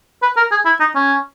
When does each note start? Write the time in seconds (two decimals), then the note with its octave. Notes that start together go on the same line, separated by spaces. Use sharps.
0.22 B4
0.37 A#4
0.51 G#4
0.66 E4
0.80 D#4
0.95 C#4